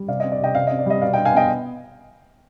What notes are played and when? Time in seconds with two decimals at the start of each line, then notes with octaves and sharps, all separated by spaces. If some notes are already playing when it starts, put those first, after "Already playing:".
Already playing: G3
0.08 C3 D5 F5
0.20 D#5
0.23 C4
0.32 D5
0.40 C3 D#5 G5
0.54 C3 D5 F5
0.67 D#5
0.71 C4
0.79 D5
0.86 G3 D#5
1.01 B2 D5 F5
1.13 D#5 G5
1.17 D4
1.25 F5 G#5
1.34 B3 D#5 G5